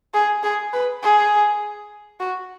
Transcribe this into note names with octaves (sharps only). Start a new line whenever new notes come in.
G#4
G#4
B4
G#4
F#4